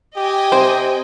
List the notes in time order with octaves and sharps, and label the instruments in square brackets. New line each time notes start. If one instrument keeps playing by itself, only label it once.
[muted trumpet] G4 [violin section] D#5 G5 G#5
[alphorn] C3 [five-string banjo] C5